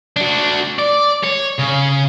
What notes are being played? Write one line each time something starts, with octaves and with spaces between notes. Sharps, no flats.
D4 F#4
D5
C#5
C#3